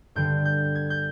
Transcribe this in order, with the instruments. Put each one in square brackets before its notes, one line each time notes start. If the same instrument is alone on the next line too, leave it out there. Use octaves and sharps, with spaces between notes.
[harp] G2 D3 G3 B3 G6
G6
G#6
G6